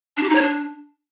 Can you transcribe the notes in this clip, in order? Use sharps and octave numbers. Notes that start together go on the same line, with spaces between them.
D4
G4
D#4
C#5
D4